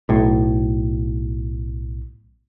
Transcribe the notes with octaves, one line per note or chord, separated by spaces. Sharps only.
B1 A2